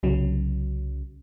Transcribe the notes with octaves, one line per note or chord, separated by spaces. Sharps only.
C2 C#3 F#3